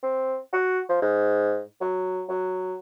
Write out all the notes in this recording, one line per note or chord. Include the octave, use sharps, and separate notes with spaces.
C4
F#4
F3
G#2
F#3
F#3